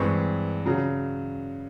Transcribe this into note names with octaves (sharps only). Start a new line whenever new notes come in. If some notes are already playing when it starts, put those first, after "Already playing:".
Already playing: G2 E3 G#3 C4 C#6
C#3 F#3